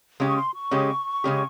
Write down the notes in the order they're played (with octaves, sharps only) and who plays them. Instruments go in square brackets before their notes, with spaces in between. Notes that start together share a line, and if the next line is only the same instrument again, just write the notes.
[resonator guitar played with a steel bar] C#3 G#3 C#4 G4
[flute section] C#6
C6
C#6
[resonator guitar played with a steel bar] C#3 G#3 C#4 G4
C#3 G#3 C#4 G4